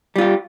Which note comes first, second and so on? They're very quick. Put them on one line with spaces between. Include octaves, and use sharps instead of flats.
G3 F4 G4